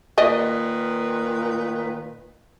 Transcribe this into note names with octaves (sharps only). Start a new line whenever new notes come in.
A#2 D#3 B4 D5 D#5